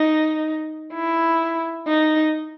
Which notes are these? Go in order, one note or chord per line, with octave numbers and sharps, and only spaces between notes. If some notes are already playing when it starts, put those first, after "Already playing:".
Already playing: D#4
E4
D#4